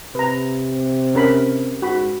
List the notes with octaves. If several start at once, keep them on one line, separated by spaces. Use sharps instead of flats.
C3 B4 A#5
C#4 A#4 B5
G#2 F#4 B5